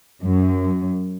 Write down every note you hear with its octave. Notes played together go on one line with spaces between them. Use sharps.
F#2